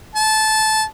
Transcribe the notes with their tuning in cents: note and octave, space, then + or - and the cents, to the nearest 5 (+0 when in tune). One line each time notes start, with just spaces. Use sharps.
A5 -15